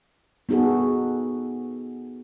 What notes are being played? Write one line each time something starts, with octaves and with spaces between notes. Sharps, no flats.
B3 D#4 F#4 G#4 A4